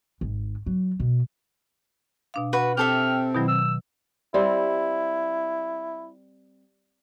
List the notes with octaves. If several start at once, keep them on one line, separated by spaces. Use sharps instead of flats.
G#1
F#3
B2
B2 D4 F5
F#4 B4
C4 G4 A4 E5 F6
B2 D#3 F#3 E4
E6
G3 C4 E4